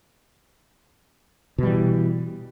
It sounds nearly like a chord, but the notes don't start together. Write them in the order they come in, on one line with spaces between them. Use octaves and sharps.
B2 G3 E3